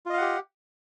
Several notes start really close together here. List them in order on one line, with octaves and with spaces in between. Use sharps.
F4 D#5 F5 F#5 G4